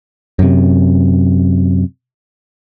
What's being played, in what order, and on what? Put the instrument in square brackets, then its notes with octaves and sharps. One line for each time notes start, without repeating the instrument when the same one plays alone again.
[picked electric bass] F#2 C3